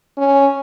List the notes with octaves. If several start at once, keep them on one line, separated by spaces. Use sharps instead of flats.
C#4